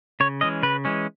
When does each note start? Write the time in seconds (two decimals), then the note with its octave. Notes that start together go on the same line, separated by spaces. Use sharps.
0.20 C#3 C#5
0.41 E3 G#3 C#4 D#5
0.63 C#3 B4
0.85 E3 G#3 C#4